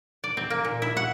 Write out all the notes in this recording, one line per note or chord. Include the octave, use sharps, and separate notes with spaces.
D5
C4
A#3
A#2
E4
F#5